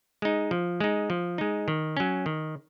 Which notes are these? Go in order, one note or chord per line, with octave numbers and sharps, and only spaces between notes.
G#3 D#4
F3
G#3 D#4
F3
G#3 D#4
D#3
F#3 C#4
D#3